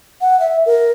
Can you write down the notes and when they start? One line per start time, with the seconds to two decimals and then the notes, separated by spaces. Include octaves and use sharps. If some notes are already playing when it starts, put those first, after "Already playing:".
0.21 F#5
0.40 E5
0.66 A#4